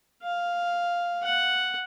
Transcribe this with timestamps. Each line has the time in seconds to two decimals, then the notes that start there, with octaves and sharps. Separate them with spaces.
0.23 F5
1.23 F#5